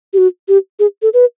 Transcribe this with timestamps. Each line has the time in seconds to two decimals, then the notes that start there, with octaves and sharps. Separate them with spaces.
0.13 G4
0.18 F#4
0.48 G4
0.79 G#4
1.02 A4
1.14 B4